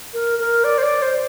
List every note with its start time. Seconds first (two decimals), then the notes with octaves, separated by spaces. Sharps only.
0.14 A#4
0.39 A#4
0.64 D5
0.78 C5
0.83 D5
1.02 C5